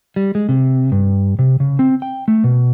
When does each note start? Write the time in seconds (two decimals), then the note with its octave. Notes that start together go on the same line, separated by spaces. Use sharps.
0.16 G3
0.35 G#3
0.49 C3
0.92 G2
1.39 C3
1.60 C#3
1.79 C4
2.02 G5
2.28 A3
2.44 B2